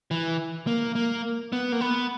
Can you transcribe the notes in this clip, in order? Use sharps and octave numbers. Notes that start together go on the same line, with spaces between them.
E3
A#3
A#3
B3
A#3
B3